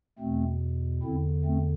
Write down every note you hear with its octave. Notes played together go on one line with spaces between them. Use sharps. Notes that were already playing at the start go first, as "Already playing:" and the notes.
E2 B2 A3 C4
E2 D3 C4 E4
A3 C4